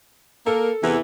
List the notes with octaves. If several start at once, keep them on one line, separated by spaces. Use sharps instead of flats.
A#3 A4 A#4
E2 C3 E3